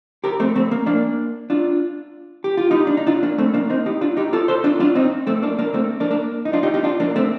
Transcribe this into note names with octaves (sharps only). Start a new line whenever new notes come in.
G4 A#4
A3 C4
A3 C4
A#3
A#3 D4
D4 F4
G4
F4
D#4 G4
D4
D#4
D4 F4
A#3 D4
A3 C4
A#3 D4
C4 D#4
D#4 G4
D4 F4
D#4 G4
F4 A4
A4 C5
D4 F4
D4 F4
C4 D#4
A3 C4
A#3 D4
A#3 D4
A3 C4
A#3 D4
A#3 D4
D#4
D4 F4
D#4 G4
D#4 G4
D4 F4
A#3 D4
A3 C4